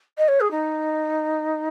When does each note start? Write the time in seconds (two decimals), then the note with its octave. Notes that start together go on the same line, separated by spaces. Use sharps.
0.18 D#5
0.28 C#5
0.40 G#4
0.51 D#4